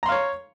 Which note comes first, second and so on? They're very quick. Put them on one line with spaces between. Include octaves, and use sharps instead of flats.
A#5 C6 F5 C#5